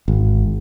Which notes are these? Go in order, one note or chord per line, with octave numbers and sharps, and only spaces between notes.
G#1